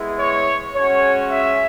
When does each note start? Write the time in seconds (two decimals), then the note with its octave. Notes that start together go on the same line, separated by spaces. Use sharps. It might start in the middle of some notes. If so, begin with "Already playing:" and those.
Already playing: G#3 B3 E4
0.19 C#5
0.75 G#3 C#4 F#4 C#5
1.31 E5